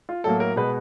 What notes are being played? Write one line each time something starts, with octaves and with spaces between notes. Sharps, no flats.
F4
A2 F#3 A#3 A4
A#4
B2 G#3 B3 B4